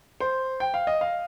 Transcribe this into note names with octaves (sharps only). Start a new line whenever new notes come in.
C5
G5
F5
D#5
F5